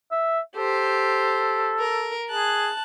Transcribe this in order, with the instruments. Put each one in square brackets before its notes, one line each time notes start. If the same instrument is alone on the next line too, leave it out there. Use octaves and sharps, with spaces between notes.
[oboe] E5
[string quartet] G4 C5 [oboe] A4
[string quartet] A#4
[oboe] G#4 [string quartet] A5 F#6